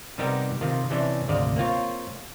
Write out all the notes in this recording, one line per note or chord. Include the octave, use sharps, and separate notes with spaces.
C3 G3 B3 D#4 G4 A#4
C3 D#3 F4
C3 E3 C#4 D4 E5
G#1 D2 C3 D5 D#5 F5
A#3 C4 F4 C#5